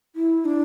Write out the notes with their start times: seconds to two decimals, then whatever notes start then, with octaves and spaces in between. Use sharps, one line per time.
0.16 E4
0.45 D4